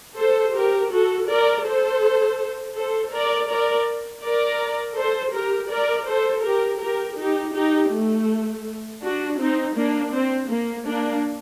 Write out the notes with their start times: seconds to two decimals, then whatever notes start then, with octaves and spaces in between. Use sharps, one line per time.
0.17 A4 C5
0.54 G4 A#4
0.91 F#4 A4
1.28 A#4 D5
1.65 A4 C5
2.75 A4 C5
3.12 A#4 D5
3.49 A#4 D5
4.23 A#4 D5
4.96 A4 C5
5.33 G4 A#4
5.70 A#4 D5
6.07 A4 C5
6.43 G4 A#4
6.80 G4 A#4
7.18 D#4 G4
7.54 D#4 G4
7.91 A3
9.01 D4 F#4
9.39 C4 D#4
9.75 A#3 D4
10.12 C4
10.49 A#3
10.86 A#3 D4